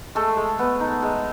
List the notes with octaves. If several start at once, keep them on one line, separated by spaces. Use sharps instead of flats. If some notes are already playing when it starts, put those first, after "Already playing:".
G#3 A3 A4
G#3
B3
D#4
G#3